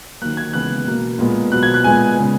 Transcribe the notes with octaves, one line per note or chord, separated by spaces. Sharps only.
D#3 F#3 A#3 F#6
G#6
C#3 E3 G#3 B3 F#6
B2 A#3
A#2 G#3 B3
B2 F#3 B3 F#6
G#6
F#6
A#2 G#3 B3 G#5
C#3 G#3 B3